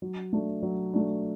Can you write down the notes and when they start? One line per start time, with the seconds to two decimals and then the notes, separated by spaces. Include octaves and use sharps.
0.02 F#3
0.33 A3 D4
0.62 F#3
0.93 A3 D4